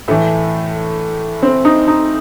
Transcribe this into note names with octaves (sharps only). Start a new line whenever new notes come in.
A2 E3 A3
C4
D#4
D#4